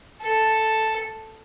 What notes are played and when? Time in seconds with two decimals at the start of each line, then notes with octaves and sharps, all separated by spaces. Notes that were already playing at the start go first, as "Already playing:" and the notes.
0.22 A4